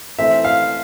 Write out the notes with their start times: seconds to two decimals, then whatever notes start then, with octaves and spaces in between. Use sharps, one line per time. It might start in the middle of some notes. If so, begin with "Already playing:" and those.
0.19 E3 A3 C4 E5
0.45 F5